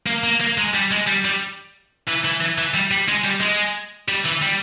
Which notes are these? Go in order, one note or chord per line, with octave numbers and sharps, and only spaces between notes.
A#3
A#3
A#3
G#3
G3
G#3
G3
G3
E3
E3
E3
E3
G3
G3
G#3
G3
G#3
G3
E3
G3